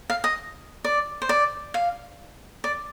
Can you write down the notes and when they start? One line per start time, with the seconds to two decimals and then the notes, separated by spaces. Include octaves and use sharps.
0.10 F5
0.24 D#5
0.84 D5
1.22 C5
1.29 D5
1.74 F5
2.64 D5